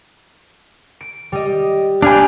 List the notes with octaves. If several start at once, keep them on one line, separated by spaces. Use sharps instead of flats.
D7
G3 D#5
D4 G4 F5 G#5 B5